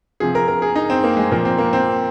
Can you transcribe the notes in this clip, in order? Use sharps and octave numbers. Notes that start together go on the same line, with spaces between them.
C3 F3 G#4
A#4
A#4
G#4
D#4
C4
A#3
G#3
A#2 F3 A#3
C4
A#3
C4